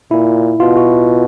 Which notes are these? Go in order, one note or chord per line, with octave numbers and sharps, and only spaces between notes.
A#2 E4
B2 F4
F#4